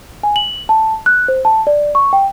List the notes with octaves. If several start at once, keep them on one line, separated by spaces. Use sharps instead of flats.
G#5
F#7
A5
F#6
C5
A5
D5
C#6
G5